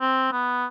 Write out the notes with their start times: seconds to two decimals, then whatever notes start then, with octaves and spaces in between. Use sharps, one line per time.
0.01 C4
0.32 B3